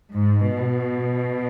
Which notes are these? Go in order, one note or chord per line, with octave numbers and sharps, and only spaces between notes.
G#2
B2